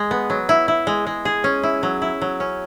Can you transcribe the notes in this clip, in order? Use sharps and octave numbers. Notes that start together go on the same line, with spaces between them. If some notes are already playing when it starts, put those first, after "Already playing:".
Already playing: G#3
B3
F#3
E4
E4
G#3
G#3
G#4
C#4
E4
F#3
E4
F#3
C#4